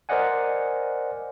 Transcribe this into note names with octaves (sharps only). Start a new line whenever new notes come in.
A#4 C5 D5 D#5 F#5 G#5